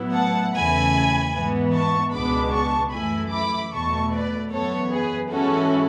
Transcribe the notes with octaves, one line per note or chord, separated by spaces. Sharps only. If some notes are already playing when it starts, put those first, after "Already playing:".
Already playing: A2 F#3 B3 E4
F#5 A5
E2 C#3 E3 A3 G#5 B5
G#2 E3 B3
A5 C#6
C#2 B2 G#3 B3 D4 B5 D6
A5 C#6
F#2 E3 A3 E4 G#5 B5
B5 D6
E2 B2 A3 A5 C#6
B4 D5
F#2 E3 B3 A4 C#5
G#4 B4
G#2 E3 G#3 C#4 E4 F#4 A4